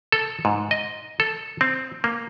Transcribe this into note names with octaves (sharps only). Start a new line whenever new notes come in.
A4
G#2
D#5
A4
C4
A#3